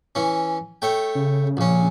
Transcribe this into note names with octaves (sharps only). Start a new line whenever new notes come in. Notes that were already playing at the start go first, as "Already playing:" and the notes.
E3 C#4
A3 C#5 G5
C#3
A#1 C#4